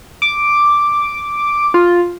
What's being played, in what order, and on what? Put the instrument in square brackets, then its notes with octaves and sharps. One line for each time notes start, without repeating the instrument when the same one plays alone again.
[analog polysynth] D6
F4